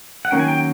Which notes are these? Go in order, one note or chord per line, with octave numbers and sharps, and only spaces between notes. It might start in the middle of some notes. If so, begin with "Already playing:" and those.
F#5
D#3 F#3 A#3 C#4 G5
G#5
G5